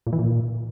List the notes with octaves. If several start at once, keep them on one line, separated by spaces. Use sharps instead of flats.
A#2
E3
A#2